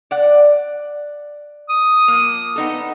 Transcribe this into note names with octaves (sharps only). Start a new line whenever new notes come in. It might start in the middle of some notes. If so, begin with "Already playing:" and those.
D5 F#5
D#6
F3 A#3
B3 D#4 A4